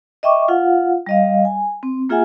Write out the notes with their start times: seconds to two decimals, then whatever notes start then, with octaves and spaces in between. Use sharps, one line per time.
0.23 D#5 E5 G5 C#6 D6
0.48 F4 F5 F#5
1.06 G3 D#5 F5
1.45 G#5
1.83 C4
2.09 A#3 F4 G#4 E5 F#5 G#5